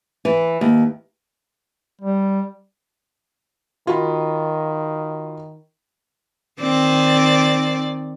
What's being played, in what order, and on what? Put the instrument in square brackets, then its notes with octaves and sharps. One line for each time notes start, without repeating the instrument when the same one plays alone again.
[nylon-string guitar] E3
D#2
[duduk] G3
[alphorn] D#3 [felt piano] F4 F#4 B5
[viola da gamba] D#3 C4 D5